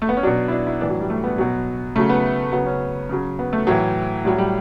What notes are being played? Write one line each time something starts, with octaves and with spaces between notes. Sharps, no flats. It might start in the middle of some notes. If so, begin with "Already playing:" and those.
A3
B3
C#4
B2 F#3 D4
E4
D4
E4
A2 E3 D4
F#3
G3
A3
B3
B2 F#3
C#3 F#3 A3
B3
C#3 F#3 B3
C#4
C#3 F#3
B3
A3
A2 E3 F#3
A2 F#3 G3
G3